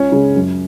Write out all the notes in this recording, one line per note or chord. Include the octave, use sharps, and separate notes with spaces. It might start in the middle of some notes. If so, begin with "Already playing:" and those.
Already playing: C#2 C#4
C#3 G#3
F#2